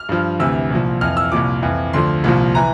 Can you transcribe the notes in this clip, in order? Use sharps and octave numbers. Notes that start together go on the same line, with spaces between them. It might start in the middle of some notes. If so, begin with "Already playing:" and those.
Already playing: F6
G2 F3
D2 C3 E3 E6
C2 A#2 F3
F2 E3 F6
E6
C2 A#2 F3 D6
F2 E3
D2 D3 F3 C6
C2 A#2 F3
E3 A#5